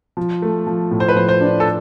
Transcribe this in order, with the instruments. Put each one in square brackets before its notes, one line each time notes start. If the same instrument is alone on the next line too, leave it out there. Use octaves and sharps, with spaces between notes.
[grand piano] F3
A3
F3
A2
[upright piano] C5
B4
[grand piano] F3 [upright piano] C5
[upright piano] C5
[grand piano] D4
[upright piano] A4